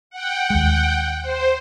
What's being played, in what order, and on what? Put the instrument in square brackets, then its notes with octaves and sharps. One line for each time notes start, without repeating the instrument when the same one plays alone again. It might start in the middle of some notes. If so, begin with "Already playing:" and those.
[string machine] F#5 G5
[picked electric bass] D#2 G#3
[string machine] C5